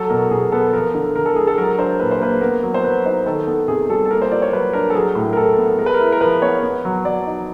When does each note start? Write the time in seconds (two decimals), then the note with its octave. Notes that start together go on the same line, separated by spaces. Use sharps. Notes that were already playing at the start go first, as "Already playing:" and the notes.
Already playing: F#3 A4
0.10 B2 A#4
0.31 B2 G#4
0.52 B3 A4
0.73 F3 A#4
0.95 D3
1.15 D3 A#4
1.26 A4
1.36 G#3 G#4
1.47 A4
1.58 F#3 A#4
1.78 D4 C5
2.00 A#2 B4
2.11 C5
2.21 A#3 B4
2.41 B3 A#4
2.63 F#3
2.74 C5
2.84 F#3 B4
3.05 D#4 C5
3.26 D#3 A4
3.47 B3 A4
3.68 C3 G#4
3.90 G3 A4
4.05 A4
4.11 A#3 A#4
4.22 C5
4.31 F4 D5
4.42 C#5
4.52 F#3 B4
4.73 D4 A#4
4.90 A4
4.95 F#3 G#4
5.15 A2
5.33 A#4
5.37 A2 A4
5.58 B3
5.79 G#3 A#4
5.86 B4
5.94 A#4
6.00 E4
6.12 A#4
6.21 F3 B4
6.42 B3 C#5
6.63 B3
6.85 F#3
7.05 F#3 D5
7.26 D#4